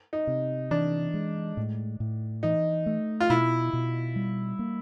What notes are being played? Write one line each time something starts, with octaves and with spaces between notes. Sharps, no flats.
D#4
C3
E3 D4
G#3
A2
A2
E3 D#4
A3
F4
B2 E4
B2
G3
A#3